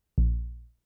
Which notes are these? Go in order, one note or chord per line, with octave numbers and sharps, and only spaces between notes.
A#1